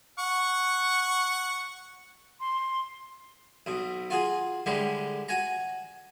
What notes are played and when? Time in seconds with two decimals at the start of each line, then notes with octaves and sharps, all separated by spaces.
0.19 F#5 C#6
2.40 C6
3.66 B1 B2
4.10 F4 F#4 G#4
4.66 A2 D3 G3 G#3
5.28 F#4 G#5 A#5